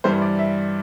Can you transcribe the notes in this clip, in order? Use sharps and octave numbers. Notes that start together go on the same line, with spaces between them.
G2 E3 G3 C5
D5
E5